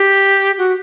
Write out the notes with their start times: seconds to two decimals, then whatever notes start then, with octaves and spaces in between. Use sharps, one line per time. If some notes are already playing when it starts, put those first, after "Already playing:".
Already playing: G4
0.58 F#4